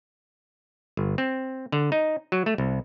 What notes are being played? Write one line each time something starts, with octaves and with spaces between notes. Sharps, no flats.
G1
C4
D3
D#4
F#3
A3
C2